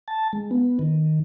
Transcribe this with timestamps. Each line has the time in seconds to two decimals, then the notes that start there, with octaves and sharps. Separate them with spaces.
0.08 A5
0.33 G#3
0.51 B3
0.79 D#3